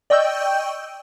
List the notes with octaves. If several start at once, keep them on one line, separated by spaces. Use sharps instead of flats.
D5 D#5 G5 C#6 E6 G6